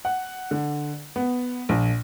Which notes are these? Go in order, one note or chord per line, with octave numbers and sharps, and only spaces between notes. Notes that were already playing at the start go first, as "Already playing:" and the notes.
F#5
D3
B3
A#1